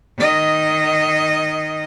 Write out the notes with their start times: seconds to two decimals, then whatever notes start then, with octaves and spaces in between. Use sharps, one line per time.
0.18 D#3 D#5